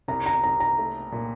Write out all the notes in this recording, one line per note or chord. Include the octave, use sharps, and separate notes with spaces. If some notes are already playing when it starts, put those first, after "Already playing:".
C2 A#5
A#5
C2 A#5
A#5
A3
A#2